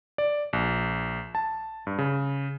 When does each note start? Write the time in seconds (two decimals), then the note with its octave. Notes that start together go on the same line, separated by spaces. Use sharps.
0.18 D5
0.53 A#1
1.35 A5
1.87 G2
1.98 C#3